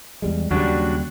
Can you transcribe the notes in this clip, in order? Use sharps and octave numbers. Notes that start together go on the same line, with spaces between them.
E2 G3 G#3
D#2 C#3 F#3 G3 D4 F#4